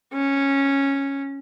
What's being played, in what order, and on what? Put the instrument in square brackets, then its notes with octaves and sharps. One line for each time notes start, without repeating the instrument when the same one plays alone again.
[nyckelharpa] C#4